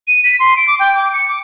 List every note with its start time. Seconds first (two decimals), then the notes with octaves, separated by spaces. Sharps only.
0.08 D#7
0.24 B6
0.40 C6
0.56 D7
0.67 D6
0.80 G5
0.95 D6
1.13 C#7
1.28 D6